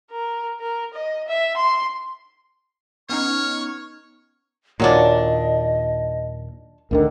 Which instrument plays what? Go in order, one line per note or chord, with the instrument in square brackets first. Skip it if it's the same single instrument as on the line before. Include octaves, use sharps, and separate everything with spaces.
[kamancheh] A#4
A#4
D#5
E5
C6
[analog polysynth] B3 C#4 D#4 [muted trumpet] C#5 [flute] C#6 [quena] F6
[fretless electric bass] D#2 A#2 [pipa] F#3 C#4 D4 [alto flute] D#5
[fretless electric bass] D2 D3 D#3 [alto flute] A#4